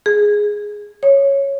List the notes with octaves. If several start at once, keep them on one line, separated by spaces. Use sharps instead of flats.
G#4
C#5